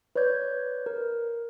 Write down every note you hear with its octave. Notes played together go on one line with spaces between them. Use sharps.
B4 C#5 D5 G6 G#6
A#4